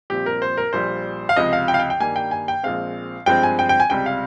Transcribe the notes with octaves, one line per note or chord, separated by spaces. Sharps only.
A#1 A#2 G3 C4 G4
A#4
C5
A#4
A#1 A#2 G3 C5
F5
C#2 C3 F3 D#5
F5
G5
F5
G5
G5
G2 D#3 G3 A#3 G#5
G5
G#5
G5
A#1 A#2 G#3 C4 F5
G2 F3 G#3 C4 G5
G#5
G5
G5
G#5
C#2 C3 G3 G5
F5